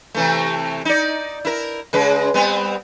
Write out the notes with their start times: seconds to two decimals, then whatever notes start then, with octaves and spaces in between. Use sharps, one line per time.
0.15 C3 E3 A3
0.85 D#4 D5
1.45 E4 A#4
1.93 C#3 G#3 B4
2.34 G3 B3 C4